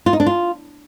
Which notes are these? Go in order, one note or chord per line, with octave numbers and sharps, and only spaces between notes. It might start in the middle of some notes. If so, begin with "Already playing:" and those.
F4
D#4
D4
F4